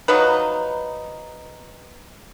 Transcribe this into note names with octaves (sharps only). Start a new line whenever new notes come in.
F3 F#3 D#4 B4